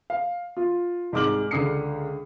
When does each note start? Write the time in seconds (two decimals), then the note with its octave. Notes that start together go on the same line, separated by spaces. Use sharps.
0.10 F5
0.57 F4
1.12 C2 G#2 G#3 D6 F6 F#7
1.51 C#2 D3 D#6 C7 C#7